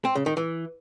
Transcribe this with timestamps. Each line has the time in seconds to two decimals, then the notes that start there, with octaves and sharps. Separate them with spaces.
0.05 C4
0.15 C#3
0.26 D#3
0.37 E3